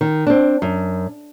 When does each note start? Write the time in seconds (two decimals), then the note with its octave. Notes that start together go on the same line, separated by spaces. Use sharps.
0.01 D#3
0.27 C4 D4
0.62 F#2